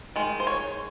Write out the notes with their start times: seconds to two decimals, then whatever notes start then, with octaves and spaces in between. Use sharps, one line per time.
0.16 D#3 G#3
0.40 C5
0.47 C#5